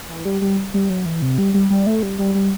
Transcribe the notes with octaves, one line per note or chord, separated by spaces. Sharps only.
E3
G3
G3
G3
F#3
E3
C3
G3
G3
G3
A3
G3
G3
G3